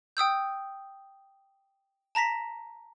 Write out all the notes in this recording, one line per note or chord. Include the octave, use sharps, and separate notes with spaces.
G5 D#6 E6 G6
A5 A#5 A#6 B6